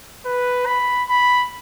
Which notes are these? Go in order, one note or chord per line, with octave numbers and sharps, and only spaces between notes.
B4
B5
B5